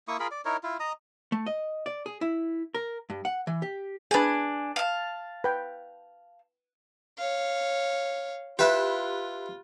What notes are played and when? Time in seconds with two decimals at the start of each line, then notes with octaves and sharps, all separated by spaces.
0.08 A#3 E4 C#6 D#6
0.20 F4 G#4 A#4 B5
0.31 D5
0.45 D#4 E4 A#4 C#5
0.63 E4 F4
0.80 D#5 A#5 D#6
1.32 A3
1.46 D#5
1.86 D5
2.06 G#4
2.21 E4
2.74 A#4
3.10 G2
3.25 F#5
3.47 E3
3.62 G4
4.11 D4 G#4 B4 G#5
4.76 F5 A5
5.44 B4 G5
7.18 C#5 F5
8.59 E4 F4 G4 B4 G5 B5 F#6